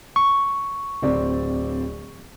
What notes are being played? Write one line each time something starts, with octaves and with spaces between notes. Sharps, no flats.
C#6
D1 C4 D5